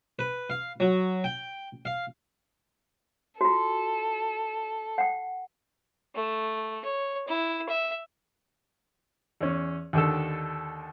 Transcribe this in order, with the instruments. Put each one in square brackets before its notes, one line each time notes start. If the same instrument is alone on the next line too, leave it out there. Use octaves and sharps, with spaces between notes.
[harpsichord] B4
F5
F#3
G5
F5
[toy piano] F4 F#4 [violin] A4
[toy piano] F#5 G5
[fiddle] A3
C#5
E4
E5
[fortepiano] E2 C#4
D#2 D3 D#3 A4